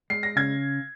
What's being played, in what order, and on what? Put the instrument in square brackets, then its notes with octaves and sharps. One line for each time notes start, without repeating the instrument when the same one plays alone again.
[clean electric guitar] G#3 [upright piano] C7
[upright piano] A#6
[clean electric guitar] C#3 [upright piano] G#6